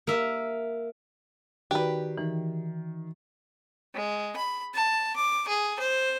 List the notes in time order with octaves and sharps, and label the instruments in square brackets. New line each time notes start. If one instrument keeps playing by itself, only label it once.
[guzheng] A#3 E5
[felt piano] D#3 [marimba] F#4 D5 [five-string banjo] G4 B4
[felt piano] D#3 [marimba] E3
[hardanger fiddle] G#3
B5
A5
D6
G#4
C5